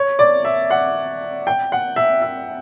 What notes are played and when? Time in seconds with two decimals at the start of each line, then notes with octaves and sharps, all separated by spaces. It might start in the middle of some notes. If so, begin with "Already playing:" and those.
Already playing: C#5
0.19 D5
0.45 E5
0.71 F#5
1.47 G5
1.72 F#5
1.96 E5
2.22 E5